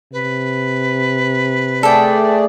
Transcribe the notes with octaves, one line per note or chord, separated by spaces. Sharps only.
C3 B4
A3 G#4 A4 D5 G5